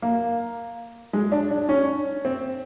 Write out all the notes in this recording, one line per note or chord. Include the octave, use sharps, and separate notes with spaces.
A#3
G#3
D4
D4
C#4
C4